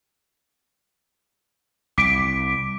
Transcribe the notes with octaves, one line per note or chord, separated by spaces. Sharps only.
C2 D6 B6 D7